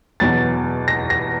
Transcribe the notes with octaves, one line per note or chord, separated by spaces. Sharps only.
E2 B2 F#3 B3 A6
A#6
A#6